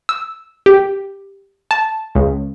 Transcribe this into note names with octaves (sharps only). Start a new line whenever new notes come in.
E6
G4
A5
C#2